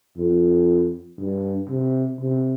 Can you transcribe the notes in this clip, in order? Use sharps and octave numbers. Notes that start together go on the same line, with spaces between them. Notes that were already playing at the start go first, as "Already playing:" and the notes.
F2
G2
C3
C3